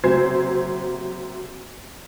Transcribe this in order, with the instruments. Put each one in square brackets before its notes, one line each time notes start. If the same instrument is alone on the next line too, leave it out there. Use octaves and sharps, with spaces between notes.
[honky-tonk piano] F#1 C3 F#3 C5 G#6 C7